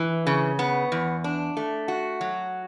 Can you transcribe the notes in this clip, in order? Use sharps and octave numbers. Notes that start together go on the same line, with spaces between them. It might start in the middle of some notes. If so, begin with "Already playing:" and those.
Already playing: E3
C#3
B3
E2
D4
A3
F#4
F#3